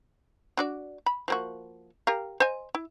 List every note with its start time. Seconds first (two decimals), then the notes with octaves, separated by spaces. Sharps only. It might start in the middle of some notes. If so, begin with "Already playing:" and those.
0.57 D4 F#4 D5
1.06 B5
1.28 F3 A#3 F#4
2.07 G4 A#4 F5
2.40 C5 D#5 G#5
2.75 E4